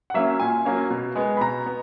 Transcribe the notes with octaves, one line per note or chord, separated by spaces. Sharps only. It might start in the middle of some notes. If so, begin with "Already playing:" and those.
F#5
F#3 A#3 C#4 E5
A#2 G#5
F#3 A#3 C#4
B2
G#3 B3
B5
B2 A#5
B3